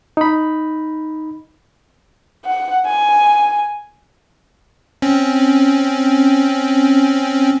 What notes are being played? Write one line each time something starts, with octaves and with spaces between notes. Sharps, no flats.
D#4 B5
F#5
G#5
C4 C#4